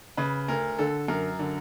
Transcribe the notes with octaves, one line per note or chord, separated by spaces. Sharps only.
C#3 B4
D2 A#4
D3 A4
F#2 A#4
D3